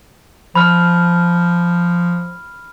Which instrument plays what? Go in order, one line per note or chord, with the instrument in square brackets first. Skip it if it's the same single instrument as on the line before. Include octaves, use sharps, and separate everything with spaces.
[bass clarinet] F3 [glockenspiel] B5 F6